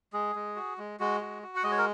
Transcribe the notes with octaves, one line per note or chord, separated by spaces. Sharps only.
G#3 G#4
G#3
F#4
G#3
G#3 F#4
F#4
F#4
F#5
G#3 D#5
C#5
A#4